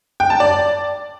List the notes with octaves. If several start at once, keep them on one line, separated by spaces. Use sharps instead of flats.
G5
A5
D5